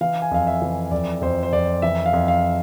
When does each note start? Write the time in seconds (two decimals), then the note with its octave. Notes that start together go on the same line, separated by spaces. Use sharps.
0.01 E3 F5
0.22 G#5
0.31 F2 F5
0.47 E5
0.62 E3
0.91 F2 D5
1.22 F2 C5
1.43 C5
1.53 F2 D5
1.82 E3 E5
2.06 F5
2.13 F2
2.28 F5